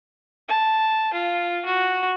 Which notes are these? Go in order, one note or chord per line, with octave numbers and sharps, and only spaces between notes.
A5
F4
F#4